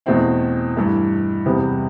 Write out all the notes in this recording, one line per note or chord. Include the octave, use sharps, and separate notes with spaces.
E2 B2 A3 C4 E4
G2 E3 A3
E2 C3 G3 B3